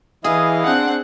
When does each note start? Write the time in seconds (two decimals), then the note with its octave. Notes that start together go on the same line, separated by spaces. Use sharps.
0.24 E3 E4 G#4 D#5 F5
0.65 C4 D4 F#5